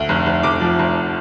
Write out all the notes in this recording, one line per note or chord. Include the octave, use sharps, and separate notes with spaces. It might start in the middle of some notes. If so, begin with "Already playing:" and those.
Already playing: D2
F1
F1
F1 D6
F3
F1